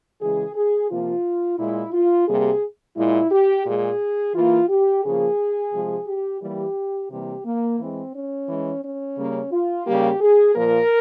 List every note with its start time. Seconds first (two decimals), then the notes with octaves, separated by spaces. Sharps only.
0.21 C#3 E3 G#3 G#4
0.55 G#4
0.90 C3 F3 A#3 F4
1.59 A#2 G#3 E4
1.93 F4
2.28 C3 G3 A#3 G#4
2.97 A#2 G#3 E4
3.32 G4
3.66 A#2 G#3 G#4
4.35 E3 A#3 F4
4.69 G4
5.03 C#3 F3 A#3 G#4
5.73 C3 F3 G#3
6.07 G4
6.41 E3 G3 A#3 G4
7.11 C3 E3 G3 A#3 G4
7.46 A#3
7.80 E3 G#3 C4
8.14 C#4
8.49 E3 G#3
8.83 C#4
9.17 C#3 G3 A#3
9.52 F4
9.87 C#3 G3 A#3 G4
10.21 G#4
10.55 A#2 F3 A#3 A#4